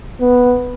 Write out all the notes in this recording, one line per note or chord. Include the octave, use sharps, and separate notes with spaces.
B3